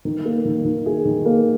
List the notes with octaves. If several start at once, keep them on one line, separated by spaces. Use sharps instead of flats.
D#3
A#3
D#3
D#3
G#4
D#3
A#3